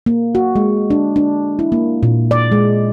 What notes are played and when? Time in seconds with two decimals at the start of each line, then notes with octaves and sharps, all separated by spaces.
0.06 A#3
0.35 F#4
0.56 G#3
0.90 D4
1.16 D4
1.59 E4
1.72 A#3
2.03 A#2
2.31 D5
2.52 G#3